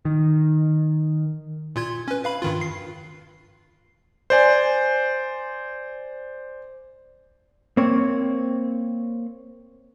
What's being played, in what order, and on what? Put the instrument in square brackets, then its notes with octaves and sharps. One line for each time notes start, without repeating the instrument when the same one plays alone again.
[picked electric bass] D#3
[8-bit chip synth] A#2 F4 G#6
C#4 B4
B4 F5 B5
G2 D#3 F4
C7
[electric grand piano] C5 D5 G#5
[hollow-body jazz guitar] A#3 C4 C#5